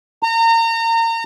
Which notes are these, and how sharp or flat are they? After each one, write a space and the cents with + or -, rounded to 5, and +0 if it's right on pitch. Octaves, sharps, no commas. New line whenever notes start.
A#5 -30